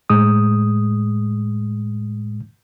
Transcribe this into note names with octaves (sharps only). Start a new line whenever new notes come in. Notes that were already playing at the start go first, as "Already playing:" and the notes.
A2 G#3 D#6